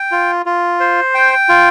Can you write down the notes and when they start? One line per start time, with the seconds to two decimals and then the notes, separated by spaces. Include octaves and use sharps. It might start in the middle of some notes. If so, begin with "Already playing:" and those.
Already playing: G5
0.12 F4
0.46 F4
0.80 C5
1.14 G5
1.49 F4